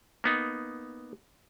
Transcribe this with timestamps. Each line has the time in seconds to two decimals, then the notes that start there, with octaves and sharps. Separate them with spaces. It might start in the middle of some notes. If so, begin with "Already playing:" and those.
0.24 A#3 B3 D#4